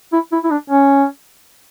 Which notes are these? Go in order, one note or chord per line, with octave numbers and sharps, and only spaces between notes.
E4
E4
E4
D4
C#4